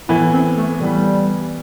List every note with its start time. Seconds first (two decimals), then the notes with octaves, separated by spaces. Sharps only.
0.09 A2 E3 B3 E4
0.33 C4
0.57 A3
0.80 A2 E3 G3 B3